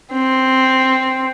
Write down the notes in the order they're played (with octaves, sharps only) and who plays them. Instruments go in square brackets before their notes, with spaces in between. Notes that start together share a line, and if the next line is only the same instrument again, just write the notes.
[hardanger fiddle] C4